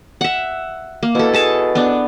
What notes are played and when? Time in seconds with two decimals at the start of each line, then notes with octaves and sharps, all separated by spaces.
0.21 E5 F#5
1.03 A#3
1.15 B2 E4 A4
1.33 G#4 A4 A5
1.75 B3 D4